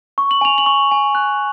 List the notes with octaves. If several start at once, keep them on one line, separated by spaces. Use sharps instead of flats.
C#6
F#7
G#5 F7
F#7
C#6
G#5
F#6